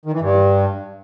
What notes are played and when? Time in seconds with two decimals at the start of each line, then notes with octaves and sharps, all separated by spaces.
0.05 D#3
0.13 E3
0.21 G2